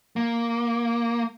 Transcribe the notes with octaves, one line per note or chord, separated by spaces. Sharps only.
A#3